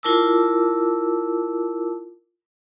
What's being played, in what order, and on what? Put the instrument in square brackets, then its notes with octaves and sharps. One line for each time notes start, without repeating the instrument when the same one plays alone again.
[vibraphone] E4 F4 A#4 A5 D6 E6